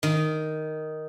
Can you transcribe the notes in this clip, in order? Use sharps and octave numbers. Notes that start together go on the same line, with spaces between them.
D#3